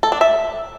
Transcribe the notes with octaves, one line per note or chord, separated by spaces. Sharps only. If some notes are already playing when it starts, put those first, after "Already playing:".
A4
D4
E5